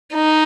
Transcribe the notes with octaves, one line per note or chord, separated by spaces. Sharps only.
D#4